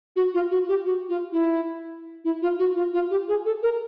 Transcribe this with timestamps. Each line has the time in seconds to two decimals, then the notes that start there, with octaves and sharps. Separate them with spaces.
0.16 F#4
0.34 F4
0.51 F#4
0.68 G4
0.85 F#4
1.09 F4
1.32 E4
2.25 E4
2.42 F4
2.59 F#4
2.76 F4
2.94 F4
3.11 G4
3.28 G#4
3.46 A4
3.63 A#4